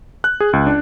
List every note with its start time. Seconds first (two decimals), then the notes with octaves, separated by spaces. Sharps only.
0.24 F#6
0.40 G#4
0.53 C#2
0.67 D4